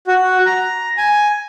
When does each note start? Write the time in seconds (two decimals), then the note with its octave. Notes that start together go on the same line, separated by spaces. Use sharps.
0.07 F#4
0.46 A#5
0.98 G#5